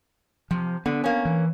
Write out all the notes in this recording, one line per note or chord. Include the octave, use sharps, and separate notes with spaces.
C3 F3
D3 B3
A#3 C#4
E3